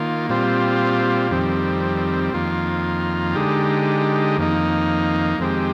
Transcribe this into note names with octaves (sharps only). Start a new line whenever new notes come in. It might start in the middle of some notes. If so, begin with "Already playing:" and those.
Already playing: D#3 A#3 F4
A#2 G3 C4 F4
F2 D#3 G3 C4
F2 D#3 A#3 F4
D3 G#3 D#4 G4
F2 D#3 A#3 D#4
F2 D#3 G#3 C4 G4